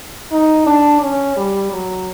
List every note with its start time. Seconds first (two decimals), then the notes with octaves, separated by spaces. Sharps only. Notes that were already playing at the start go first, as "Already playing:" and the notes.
0.32 D#4
0.67 D4
1.02 C#4
1.37 G3
1.73 F#3